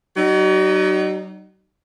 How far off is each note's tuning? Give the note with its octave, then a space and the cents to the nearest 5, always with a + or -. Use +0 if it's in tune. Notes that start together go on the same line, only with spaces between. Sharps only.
F#3 +40 D#4 -25